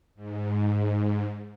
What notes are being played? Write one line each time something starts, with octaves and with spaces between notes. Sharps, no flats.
G#2